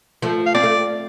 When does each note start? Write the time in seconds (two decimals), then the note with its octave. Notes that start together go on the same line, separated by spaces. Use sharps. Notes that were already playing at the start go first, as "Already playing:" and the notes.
0.22 F3 A3
0.46 F5
0.55 C4 D5
0.64 A3